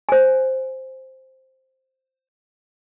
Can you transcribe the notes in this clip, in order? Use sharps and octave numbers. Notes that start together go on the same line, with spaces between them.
C5 G#5